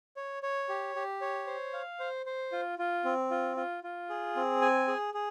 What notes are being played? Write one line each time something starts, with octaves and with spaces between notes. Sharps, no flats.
C#5
C#5
G4
G4
C#5
C5
F5
C5
C5
F4
F4
C4
F4
F4
F4
G#4
C4
G#5
G#4
G#4